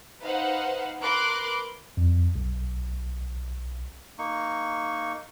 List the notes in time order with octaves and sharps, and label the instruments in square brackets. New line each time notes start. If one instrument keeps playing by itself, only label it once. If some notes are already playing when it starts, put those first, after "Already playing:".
[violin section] D#4 B4 C5 F5 F#5
A#4 B4 B5 C6 D6 F#6
[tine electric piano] F2
B1
[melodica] A#3 D#4 C#6